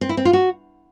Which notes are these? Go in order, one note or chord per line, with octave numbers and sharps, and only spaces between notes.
C4
E4
C4
F4
F#4